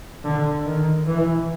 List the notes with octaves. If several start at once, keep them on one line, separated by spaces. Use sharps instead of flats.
D3
D#3
E3